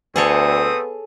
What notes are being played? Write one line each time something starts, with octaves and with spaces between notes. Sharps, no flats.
D2 A3 B3 C4 G#4 A4 C#5 D#6